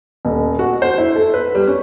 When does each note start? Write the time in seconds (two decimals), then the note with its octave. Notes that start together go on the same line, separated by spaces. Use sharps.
0.25 D#1
0.59 F#4
0.82 C5
0.98 E4
1.16 A4
1.34 B4
1.55 G3
1.67 C#4